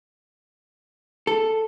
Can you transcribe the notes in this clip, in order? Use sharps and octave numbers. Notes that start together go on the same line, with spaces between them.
A4